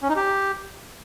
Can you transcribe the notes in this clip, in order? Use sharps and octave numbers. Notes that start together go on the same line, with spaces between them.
C#4
D#4
G4